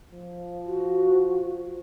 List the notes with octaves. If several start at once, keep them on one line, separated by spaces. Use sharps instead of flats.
F3
F#4